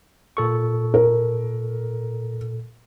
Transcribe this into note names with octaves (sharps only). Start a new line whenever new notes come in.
A#2 A4 C#6
A#4